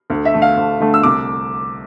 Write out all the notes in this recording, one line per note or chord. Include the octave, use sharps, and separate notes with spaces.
D2
E5
D3 A3
F5
D2
D3 A3
E6
C2 D6